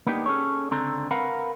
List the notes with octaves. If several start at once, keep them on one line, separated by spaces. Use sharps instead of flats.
A#3 B3 D4 D#4 G4
C#4 G#4 A4 C#5
C#2 D3 C4 A4 A#5
A#4 B4 F5 F#5 A#5 B5